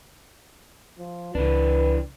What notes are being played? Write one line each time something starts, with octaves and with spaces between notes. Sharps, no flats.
F3
C#2 E3 D4 B4